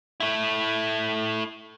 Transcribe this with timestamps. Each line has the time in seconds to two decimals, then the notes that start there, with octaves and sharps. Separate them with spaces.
0.20 A3 E4